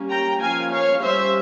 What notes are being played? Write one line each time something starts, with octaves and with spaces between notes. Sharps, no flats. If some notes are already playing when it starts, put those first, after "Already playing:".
Already playing: G3 A#3 C#4
G5 A#5
F3 A#3 C#4 F5 G#5
C#5 F5
G3 C#4 C5 E5